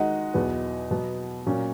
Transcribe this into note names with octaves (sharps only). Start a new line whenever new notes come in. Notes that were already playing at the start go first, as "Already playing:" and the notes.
Already playing: D#3 G#3 D#4 F#4 D#5 F#5
E2 B2 F#3 B3
B2 F#3 B3
A#2 F#3 C#4